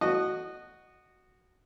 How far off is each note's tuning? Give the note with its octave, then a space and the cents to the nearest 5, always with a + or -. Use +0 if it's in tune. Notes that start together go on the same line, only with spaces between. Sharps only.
F#4 +0 D#5 -20